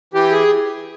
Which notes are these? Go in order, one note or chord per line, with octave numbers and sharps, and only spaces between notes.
E3 G4
G#4